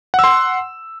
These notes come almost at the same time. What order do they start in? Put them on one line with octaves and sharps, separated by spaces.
F#5 E6 C6